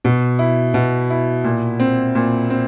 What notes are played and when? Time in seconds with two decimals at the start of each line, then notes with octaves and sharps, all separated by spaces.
0.05 B2
0.39 E4
0.74 B2
1.10 E4
1.44 A#2
1.80 C4
2.15 A#2
2.50 C4